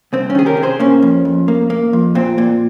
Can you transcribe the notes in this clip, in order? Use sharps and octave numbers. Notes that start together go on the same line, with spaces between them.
C2 C4
C#4
D#3 G#4
G4 A#4
C3
G#4 C5
A#3 C#4
F2
F2
A#3
A#3
F2
A#2 C4
A#2